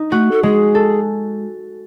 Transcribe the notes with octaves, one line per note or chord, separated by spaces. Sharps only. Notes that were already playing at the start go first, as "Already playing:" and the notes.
Already playing: D#4
A3 F#4
A4
G#3 G#4
A4